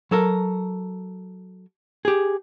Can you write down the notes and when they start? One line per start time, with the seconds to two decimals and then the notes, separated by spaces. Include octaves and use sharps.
0.11 F#3 A4 A#4
2.05 G4 G#4